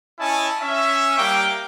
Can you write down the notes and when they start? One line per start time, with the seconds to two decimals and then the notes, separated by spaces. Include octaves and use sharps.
0.20 C#4 E4 D#5 G#5 A5
0.62 C#4 E5
1.18 G3 A#3 A#4 G5 D6